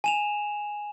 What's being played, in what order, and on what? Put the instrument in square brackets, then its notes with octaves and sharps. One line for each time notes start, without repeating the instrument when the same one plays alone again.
[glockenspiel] G#5 E7 F7